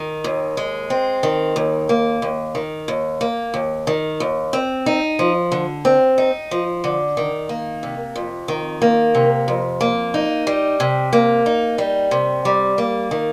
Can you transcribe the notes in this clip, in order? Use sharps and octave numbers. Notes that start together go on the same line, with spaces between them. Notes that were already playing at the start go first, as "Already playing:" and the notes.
Already playing: D#3
D#2
G#3
C4
D#3
D#2
A#3
D#2
D#3
D#2
A#3
D#2
D#3
D#2
C4
D#4
F3
D3
C4
D#4
F3
D3
D#3
A#3
C3
F2
D#3
A#3
C3
F2
A#3
D#4
G3
C3
A#3
D#4
G3
C3
G3
A#3
D#3